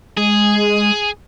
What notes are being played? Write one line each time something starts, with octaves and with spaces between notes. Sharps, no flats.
G#3 G#4